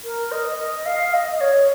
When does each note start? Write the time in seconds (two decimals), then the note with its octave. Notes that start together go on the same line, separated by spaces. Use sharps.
0.04 A#4
0.31 D#5
0.58 D#5
0.85 F5
1.08 F5
1.13 D#5
1.36 D#5
1.40 C#5